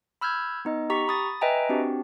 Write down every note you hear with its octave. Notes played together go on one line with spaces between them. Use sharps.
B5 E6 F6 G6 G#6
B3 D#4 D#5
G4 A#5 C#6 B6
B5 D#6 A6
B4 D#5 E5 G5 G#5 A#5
C4 D4 F#4 G4